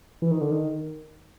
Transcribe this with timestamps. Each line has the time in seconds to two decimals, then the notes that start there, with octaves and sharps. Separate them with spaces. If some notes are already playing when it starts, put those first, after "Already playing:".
0.22 E3
0.31 D#3
0.41 D3
0.51 D#3